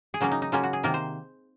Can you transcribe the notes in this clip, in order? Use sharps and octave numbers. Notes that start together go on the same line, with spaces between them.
G#4
C#3 F#3 A#3 C#4 F#4
D#4
D#4
C#3 F#3 A#3 C#4 F4
F#4
G#4
C3 D#3 A#3 A#4
C5